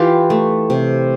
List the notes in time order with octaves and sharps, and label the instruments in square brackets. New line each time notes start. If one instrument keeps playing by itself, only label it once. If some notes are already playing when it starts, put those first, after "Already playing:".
Already playing: [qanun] E3 F4 G4
A3
C3